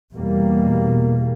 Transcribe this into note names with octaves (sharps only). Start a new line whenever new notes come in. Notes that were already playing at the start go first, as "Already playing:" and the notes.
E2 B2 G3 A#3